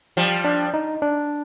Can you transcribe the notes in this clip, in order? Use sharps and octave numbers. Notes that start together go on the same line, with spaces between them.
F3 G3
D4
D#4
D4